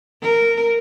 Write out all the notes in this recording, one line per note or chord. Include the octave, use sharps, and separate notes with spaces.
A#4